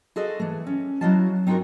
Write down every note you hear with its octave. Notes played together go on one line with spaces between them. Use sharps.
F#4 G#4 A4 C5 D#5 F5
E3 A3
C#4
F#3 E4 F#4 D#5 F5 A5
C4 D#4 F4 F#4 A#4